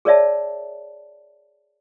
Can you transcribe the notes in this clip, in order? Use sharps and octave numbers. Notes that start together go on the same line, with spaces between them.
G#4 A#4 C#5 D5 E5 A5